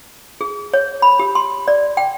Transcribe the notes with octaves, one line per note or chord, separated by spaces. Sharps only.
G#4
C#5
B5
G4
C6
D5
G5